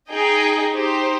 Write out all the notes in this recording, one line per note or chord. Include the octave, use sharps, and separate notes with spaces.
D#4 G#4 D#5 G5
D#4 G4 C5